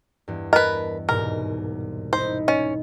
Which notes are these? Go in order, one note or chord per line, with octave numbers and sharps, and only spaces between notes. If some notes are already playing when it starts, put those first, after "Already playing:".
E2 G2
A#4 B4 D#5 A5
C2 G#2 B2 A#4
D#4 E4 C5
C#4 D#5